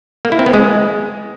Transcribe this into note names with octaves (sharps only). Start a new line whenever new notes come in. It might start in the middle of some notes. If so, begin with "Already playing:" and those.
A#3
E4
C4
B3
G#3